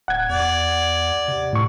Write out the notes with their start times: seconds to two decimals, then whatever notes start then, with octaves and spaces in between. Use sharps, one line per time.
0.08 D1 F#5 G#6
0.29 E2 D5
1.28 C3
1.53 A2 C#6